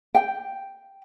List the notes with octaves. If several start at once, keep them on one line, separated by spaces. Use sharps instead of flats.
G5